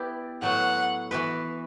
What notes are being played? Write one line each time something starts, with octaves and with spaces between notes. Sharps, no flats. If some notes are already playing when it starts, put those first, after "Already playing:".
Already playing: B3 E4 G4 D5
A2 F#3 B3 F#5
E3 B3 F#4 B4